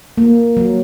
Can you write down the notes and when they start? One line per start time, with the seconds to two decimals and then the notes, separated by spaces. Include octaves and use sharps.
0.18 A#3
0.57 F#3